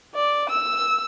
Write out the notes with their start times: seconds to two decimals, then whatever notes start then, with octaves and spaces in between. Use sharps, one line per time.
0.15 D5
0.50 E6